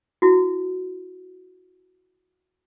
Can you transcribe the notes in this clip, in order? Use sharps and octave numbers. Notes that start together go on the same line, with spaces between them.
E4 F#4